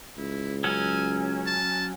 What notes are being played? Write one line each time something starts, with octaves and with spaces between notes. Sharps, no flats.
C#2 E4
F#3 C#4 G#5
A5